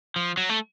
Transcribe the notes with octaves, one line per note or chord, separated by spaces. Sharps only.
F3
F#3
A3